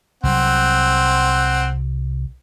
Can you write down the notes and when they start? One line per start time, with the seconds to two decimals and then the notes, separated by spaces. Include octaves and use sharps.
0.24 C2 F#3 C4 F#5